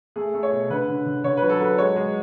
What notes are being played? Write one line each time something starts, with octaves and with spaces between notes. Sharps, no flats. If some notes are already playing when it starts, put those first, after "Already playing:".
A3 G#4
A3
C#5
B2
D3 B4
D3
D3
D3 C#5
F#3 B4
A4
F#3 B4
G#3 C#5
G#3